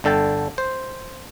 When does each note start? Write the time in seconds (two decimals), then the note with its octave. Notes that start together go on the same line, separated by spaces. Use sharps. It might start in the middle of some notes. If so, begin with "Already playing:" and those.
0.04 G1 D3 A4 G5 A5
0.58 C5